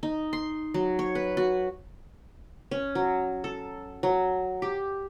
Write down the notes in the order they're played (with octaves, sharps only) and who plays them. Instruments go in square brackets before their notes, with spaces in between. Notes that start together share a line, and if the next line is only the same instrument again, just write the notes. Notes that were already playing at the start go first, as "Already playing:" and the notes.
[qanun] D#4
C6
F#3
C#5
B4
F#4
C#4
F#3
A4
F#3
G4